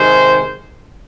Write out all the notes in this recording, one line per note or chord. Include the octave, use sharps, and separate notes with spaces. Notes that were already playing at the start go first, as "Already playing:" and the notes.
Already playing: C3 D#3 G#3 C5